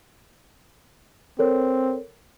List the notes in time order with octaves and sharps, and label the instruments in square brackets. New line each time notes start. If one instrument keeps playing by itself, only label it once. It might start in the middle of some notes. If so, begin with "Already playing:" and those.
[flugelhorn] C4 [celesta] A4 A#4 C#5